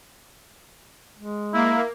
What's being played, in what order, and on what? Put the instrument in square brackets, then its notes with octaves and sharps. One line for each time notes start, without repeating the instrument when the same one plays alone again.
[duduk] G#3
[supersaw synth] A#3 [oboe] E4